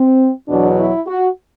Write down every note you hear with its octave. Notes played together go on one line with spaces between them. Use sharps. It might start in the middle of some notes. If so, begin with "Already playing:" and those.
Already playing: C4
E2 B2 F#3 D4
E4
F#4